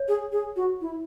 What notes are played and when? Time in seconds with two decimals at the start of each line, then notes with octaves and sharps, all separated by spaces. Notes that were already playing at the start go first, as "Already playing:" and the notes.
Already playing: C#5
0.08 G#4
0.32 G#4
0.56 F#4
0.81 E4